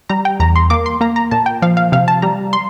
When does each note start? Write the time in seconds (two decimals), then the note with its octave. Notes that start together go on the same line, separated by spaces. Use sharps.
0.09 G3 A#5
0.25 G5
0.40 E2 A#5
0.56 C6
0.70 A#3 D6
0.86 C6
1.01 A#3 A#5
1.16 A#5
1.31 A#2 A5
1.46 G5
1.62 F3 F5
1.77 F5
1.92 C3 F5
2.08 A5
2.22 G3 A#5
2.53 C6